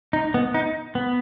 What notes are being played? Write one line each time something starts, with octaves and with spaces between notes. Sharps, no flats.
D#4
B3
D#4
B3